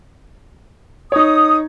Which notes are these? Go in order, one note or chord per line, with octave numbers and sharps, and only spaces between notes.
D#4 C#5 D#6